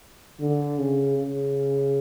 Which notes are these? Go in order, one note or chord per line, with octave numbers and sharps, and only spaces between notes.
D3
C#3
C#3